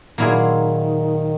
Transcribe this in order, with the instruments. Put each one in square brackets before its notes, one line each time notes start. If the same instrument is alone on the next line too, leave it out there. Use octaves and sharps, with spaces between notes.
[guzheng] A#2 F#3 A#3 E4 G#4 [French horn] D#3